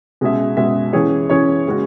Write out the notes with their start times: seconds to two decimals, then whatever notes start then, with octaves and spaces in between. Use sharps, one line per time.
0.21 B2 G#3 C#4 G#4 E5
0.57 B2 G#3 C#4 G#4 E5
0.93 E3 C#4 G#4 C#5
1.30 E3 C#4 G#4 C#5
1.67 C#3 G#3 C#4 F#4